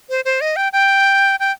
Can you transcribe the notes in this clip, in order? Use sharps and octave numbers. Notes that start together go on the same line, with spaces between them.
C5
C5
D#5
G5
G5
G5